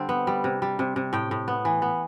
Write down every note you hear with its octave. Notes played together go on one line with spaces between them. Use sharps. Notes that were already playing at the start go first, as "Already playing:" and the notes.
Already playing: D3 G3 C4
B3
G3
C3
G3
C3
C3
A2 G5
A2
B3
E3
B3